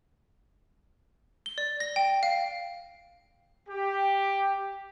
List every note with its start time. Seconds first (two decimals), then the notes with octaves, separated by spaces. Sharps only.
1.46 G7
1.58 D5
1.80 A#6
1.96 G5
2.23 F5
3.69 G4